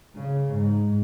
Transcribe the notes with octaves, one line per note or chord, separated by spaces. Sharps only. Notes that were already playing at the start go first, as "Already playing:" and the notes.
C#3
G#2